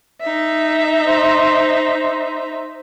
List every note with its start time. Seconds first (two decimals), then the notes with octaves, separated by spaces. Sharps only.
0.22 D#4 E5
1.08 C5